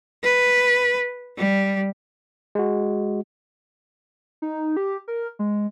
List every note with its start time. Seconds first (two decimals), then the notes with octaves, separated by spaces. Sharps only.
0.23 B4
1.37 G3
2.55 G#3 F#4
4.42 D#4
4.77 G4
5.08 A#4
5.39 G#3